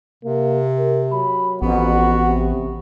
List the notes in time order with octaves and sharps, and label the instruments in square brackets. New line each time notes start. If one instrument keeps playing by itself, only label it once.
[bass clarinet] C3 [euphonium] A#3
[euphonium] A#4
[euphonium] F#3 [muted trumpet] B5
[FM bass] A1 [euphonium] F2 [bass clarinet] B3 [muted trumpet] F#4
[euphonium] C3